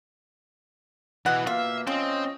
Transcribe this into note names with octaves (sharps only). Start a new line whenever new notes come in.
B2 E3 D#5 F#5
B2 A#3 F4 E5 F5
F3 C4 C#4 D#5